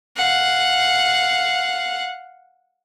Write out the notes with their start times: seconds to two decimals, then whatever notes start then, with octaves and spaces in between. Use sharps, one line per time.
0.17 F5 F#5